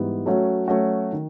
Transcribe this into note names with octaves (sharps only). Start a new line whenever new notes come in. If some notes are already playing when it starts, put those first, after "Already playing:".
Already playing: G#2 E3 G3 B3
F#3 A3 C#4 F#4
F#3 A3 C#4 F#4
D#3